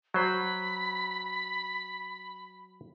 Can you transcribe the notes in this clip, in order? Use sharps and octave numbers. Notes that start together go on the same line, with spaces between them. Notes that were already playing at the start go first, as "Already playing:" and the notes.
F#3 C5 B5